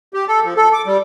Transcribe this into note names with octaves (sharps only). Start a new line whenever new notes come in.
G4
A4
F3
A4
D6
G3